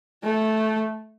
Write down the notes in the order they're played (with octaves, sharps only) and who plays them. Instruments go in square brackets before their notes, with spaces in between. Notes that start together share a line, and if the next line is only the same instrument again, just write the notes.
[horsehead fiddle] A3